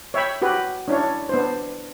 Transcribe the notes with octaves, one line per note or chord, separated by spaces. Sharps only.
C#5 E5 G5 B5
F#4 G4 B4
C#4 D4 E4 C#5
B3 D4 C5